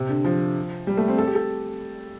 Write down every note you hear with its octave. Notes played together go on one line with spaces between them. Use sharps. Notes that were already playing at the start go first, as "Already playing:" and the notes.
Already playing: C3
D3
F3
G3
A3
C4
A4
G4
A4